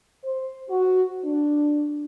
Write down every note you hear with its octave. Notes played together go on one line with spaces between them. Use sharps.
C5
F#4
D4